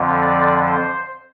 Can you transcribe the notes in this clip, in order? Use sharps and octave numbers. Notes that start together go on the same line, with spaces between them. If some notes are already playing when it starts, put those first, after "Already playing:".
Already playing: F2 D3 F3
D5
C5